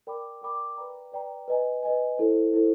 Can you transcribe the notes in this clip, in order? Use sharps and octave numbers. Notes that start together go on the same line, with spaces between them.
A#4 D5 G5 B5 D6
A#4 D5 G5 B5 D6
B4 D5 G5 A#5
B4 D5 G5 A#5
B4 D#5 G#5
B4 D#5 G#5
E4 A4 C5
E4 A4 C5